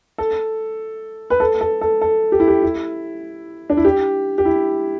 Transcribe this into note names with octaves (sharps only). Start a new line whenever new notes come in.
A4
B4
A4
A4
A4
A4
G4
E4
G4
E4
D4
E4
G4
G4
E4